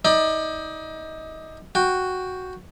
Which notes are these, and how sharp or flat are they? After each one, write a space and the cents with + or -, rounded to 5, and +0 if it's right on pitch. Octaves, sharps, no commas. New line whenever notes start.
D#4 +30 D5 +35
F#4 +0 G5 +0